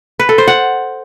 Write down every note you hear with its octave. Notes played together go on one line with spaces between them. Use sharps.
B4
A4
C5
F#5